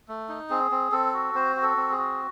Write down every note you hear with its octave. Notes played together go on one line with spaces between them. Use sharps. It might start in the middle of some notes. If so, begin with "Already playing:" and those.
A3
D#4
C4 G#4
C4
C4 A4
F#4
C4 C5
F#4
A4
C4
G#4
F#4